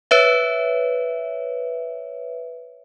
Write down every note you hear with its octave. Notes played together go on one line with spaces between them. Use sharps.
B4 C#5 E5